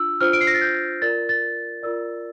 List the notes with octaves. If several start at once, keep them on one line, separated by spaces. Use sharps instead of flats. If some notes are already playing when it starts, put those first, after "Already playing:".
Already playing: D4 F4 E6
D4 F4 C5 F6
D7
C7
A#6
A6
G6
F4 A#4 D5 A6
A6
F4 A#4 D5 E6